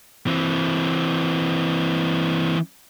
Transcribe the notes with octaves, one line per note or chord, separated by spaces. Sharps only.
E3 C4